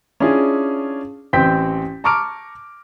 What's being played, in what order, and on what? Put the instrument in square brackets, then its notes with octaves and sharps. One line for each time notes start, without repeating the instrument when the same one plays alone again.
[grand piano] C#4 D4 E4 F4 G#4
A1 C4 C5 G5 G6 B6
A5 A#5 C#6 D6 F6 D7